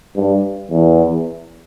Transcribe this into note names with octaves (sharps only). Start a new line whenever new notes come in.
G2
E2